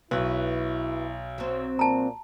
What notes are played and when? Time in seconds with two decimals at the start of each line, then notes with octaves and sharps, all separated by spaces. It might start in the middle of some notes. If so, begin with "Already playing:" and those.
0.11 B1 E4 F#4 B4 C#5
1.38 F#3 C4
1.79 A#2 A5 A#5